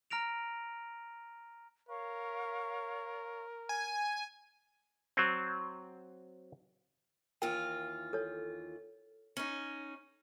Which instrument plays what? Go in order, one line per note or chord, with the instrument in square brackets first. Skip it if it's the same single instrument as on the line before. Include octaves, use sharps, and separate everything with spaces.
[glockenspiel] A#5 F6 A#6 D7 F7
[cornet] A#4 [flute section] C#5 F5 C#6
[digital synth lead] G#5
[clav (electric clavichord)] F#3 C4
[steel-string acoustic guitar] D#2 E3 F4 [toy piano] A#4 G5
[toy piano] A4 C#5
[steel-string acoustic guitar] C#4 D#4